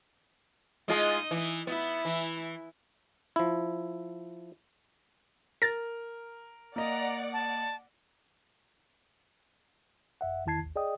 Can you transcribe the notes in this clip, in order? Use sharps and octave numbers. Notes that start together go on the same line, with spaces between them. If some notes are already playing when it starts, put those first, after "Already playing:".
G#3 D#4 F4 G#4 D#5
E3
B3 E4
E3
F3 E4
A#4 A6 A#6
A#3 D5 D#5 F#5 A#5
A5
G#1 F#2 E5 F#5
E2 D#3 E4 A5 G#6 C7
A1 D#2
G#4 D5 D#5 G5 D#6